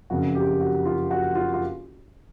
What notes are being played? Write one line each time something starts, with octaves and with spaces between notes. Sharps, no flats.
F#1 F2 C#3 F#4
G4
F#4
F4
F#4
F4
F4